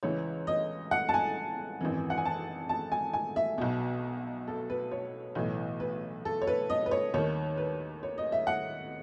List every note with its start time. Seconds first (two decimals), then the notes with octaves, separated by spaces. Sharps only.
0.03 C#2 C#3 E3 C#5
0.47 D#5
0.91 F#5
1.09 A5
1.14 G#5
1.81 G#1 F#2 E3
2.10 F#5
2.18 G#5
2.25 A5
2.69 A5
2.92 G#5
3.13 G#5
3.36 E5
3.58 B1 B2
4.48 A4
4.70 B4
4.91 C#5
5.35 B1 A2 E3
5.80 B4
6.25 A4
6.42 C#5
6.47 B4
6.70 D#5
6.86 B4
6.91 C#5
7.14 D#2 D#3 C#5
7.58 B4
8.03 C#5
8.18 D#5
8.32 E5
8.47 F#5